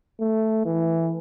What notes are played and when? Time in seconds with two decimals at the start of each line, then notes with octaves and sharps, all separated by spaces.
0.20 A3
0.65 E3